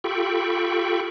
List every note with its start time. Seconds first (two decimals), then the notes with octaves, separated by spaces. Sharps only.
0.04 F4 G4 A4 G5 B5 C#6